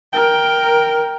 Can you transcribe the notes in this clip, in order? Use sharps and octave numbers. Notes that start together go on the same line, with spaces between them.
A#4 G5